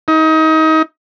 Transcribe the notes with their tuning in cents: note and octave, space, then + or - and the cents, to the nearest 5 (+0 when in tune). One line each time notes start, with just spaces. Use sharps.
D#4 +30